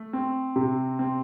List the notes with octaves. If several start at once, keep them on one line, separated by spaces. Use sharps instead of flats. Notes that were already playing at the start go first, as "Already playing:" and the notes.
Already playing: A3
C4
C3
C4